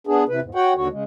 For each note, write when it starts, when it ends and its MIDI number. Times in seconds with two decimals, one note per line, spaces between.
0.07 0.24 59
0.07 0.24 62
0.07 0.24 68
0.29 0.40 48
0.29 0.40 52
0.29 0.40 71
0.43 0.50 40
0.43 0.50 44
0.55 0.73 66
0.55 0.73 73
0.55 0.73 78
0.55 0.73 79
0.76 0.88 39
0.76 0.88 50
0.76 0.88 66
0.76 0.88 73
0.91 1.04 49
0.91 1.04 56